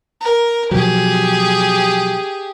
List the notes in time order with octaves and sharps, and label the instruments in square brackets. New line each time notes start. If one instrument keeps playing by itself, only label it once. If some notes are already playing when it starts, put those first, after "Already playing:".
[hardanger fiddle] A#4
[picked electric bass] B2 F3 F#3 [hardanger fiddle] G4 G#4